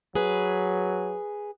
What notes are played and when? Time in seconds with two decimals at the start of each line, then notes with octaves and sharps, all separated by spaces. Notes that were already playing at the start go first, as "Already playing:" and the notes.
0.15 F#3 G#4 B4